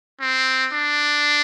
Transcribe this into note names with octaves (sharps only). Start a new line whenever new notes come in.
C4
D4